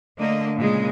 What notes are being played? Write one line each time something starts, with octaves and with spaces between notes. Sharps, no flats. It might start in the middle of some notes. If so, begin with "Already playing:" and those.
D3 A3 A#3 D#5
A#2 C#3 G#3